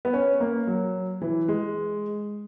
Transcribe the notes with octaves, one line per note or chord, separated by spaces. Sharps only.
B3
C#4
A#3
F#3
E3
G#3